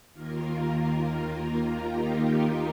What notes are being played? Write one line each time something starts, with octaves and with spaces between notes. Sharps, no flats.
D#2 D#3 A#3 F4 A#4
F4
D#4 G4
F4 A#4